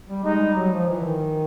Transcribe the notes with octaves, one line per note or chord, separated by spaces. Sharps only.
G3
G#3 D#4
G3
F#3
F3
E3
D#3